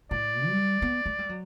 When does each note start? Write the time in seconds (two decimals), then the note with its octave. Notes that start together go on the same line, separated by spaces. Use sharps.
0.11 A2 D5
0.47 G3
0.82 B3
1.06 A3
1.19 G3
1.29 F#3